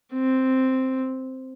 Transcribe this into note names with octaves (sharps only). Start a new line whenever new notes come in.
C4